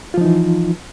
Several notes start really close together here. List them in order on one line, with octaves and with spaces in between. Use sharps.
F4 F3 D#4 E3